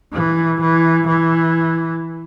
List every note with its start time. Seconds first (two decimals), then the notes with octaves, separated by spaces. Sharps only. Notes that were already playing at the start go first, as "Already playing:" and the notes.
0.13 E3
0.61 E3
1.07 E3